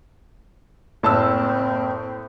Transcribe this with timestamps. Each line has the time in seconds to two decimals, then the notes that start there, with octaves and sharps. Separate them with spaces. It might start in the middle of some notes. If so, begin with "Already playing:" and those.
1.03 F#1 A2 C4 A5 E6